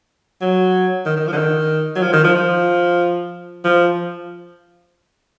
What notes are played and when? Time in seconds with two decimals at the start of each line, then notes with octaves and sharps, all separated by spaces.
0.41 F#3
1.06 D#3
1.17 D#3
1.27 F3
1.32 D3
1.37 D#3
1.96 F#3
2.02 F3
2.13 D#3
2.24 F3
2.35 F3
3.65 F3